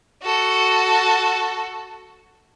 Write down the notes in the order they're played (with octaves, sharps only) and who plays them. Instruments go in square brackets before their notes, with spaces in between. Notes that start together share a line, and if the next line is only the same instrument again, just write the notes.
[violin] F#4 A4